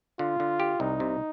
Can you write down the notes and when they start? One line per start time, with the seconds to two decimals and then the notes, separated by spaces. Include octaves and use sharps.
0.19 D3 F4
0.40 D3
0.60 G4
0.80 C2 D#4
1.00 C3